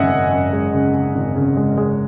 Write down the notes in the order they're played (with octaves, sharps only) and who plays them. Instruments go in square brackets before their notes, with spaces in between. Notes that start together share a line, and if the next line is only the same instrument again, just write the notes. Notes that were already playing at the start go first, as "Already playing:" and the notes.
Already playing: [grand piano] G#1 F#2 C#3 D#5 E5 F#5 G#5
F#2
F#2
G#3
C#3
C#3
G#1
C#3
G#3
G#3